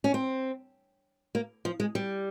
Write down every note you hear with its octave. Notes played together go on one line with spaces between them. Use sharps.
C#4
C4
A#3
F3
G#3
G3